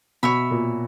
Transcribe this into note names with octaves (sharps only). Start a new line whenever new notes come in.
B2 C#5 E5 B5
A#2